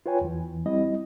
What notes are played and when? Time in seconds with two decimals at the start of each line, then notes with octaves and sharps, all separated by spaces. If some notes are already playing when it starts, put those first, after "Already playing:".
0.06 F4 B4 C#5 G5 G#5
0.21 E2 E3
0.66 G3 C4 E4 D#5